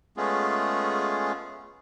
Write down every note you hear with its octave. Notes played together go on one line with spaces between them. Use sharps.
G#3 A3 B3 C#4 F4 G#4